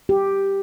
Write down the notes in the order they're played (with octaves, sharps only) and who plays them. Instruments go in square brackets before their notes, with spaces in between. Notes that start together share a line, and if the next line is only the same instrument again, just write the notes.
[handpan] G4